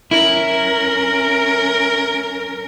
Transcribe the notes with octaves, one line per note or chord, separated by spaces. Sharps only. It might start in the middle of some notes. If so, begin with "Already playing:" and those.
C#4 E4 A#4